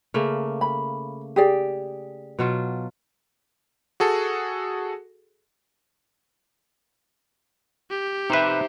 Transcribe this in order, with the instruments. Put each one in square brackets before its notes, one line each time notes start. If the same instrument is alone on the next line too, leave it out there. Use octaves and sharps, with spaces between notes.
[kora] C#3 A3 A#3
[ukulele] B5
G4 G#4 D5
[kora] B2 F#3 F4
[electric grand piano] F#4 G#4 A4
[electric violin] G4
[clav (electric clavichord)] C3 B4 [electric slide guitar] D#4 C5 E5